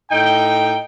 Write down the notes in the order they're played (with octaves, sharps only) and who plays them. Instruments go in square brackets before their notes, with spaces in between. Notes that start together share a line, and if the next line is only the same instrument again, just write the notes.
[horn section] A2 D#4 G5